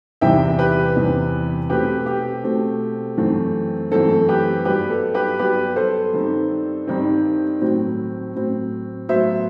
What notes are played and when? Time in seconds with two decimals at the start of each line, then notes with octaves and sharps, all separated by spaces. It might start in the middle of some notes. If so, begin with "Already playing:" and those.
0.21 E2 C3 E3 G3 C4 E5 G5
0.59 G4 B4
0.96 E2 C3 E3 G3 C4
1.70 B2 A3 C4 G4 B4
2.06 G4
2.43 B2 A3 C4
3.18 F#2 E3 A3 C4
3.92 F#2 E3 A3 C4 A4
4.28 G4 B4
4.65 G2 F#3 B3 G4 B4
4.90 A4
5.14 G4 B4
5.39 G2 F#3 B3 G4 B4
5.76 A4 C5
6.13 G2 D#3 G3 C4
6.87 G2 D#3 G3 C4
7.61 A2 F#3 C4
8.36 A2 F#3 C4
9.09 A2 F#3 B3 C5 E5